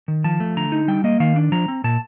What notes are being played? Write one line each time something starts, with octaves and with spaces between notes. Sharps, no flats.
D#3
F3 A5
A3
D3 A#5
D#4
G3 G5
A#3 D#5
D#3 F5
D4
F3 A#5
C4
A#2 A5